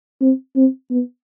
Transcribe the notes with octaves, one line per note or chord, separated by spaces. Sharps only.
C4
C4
B3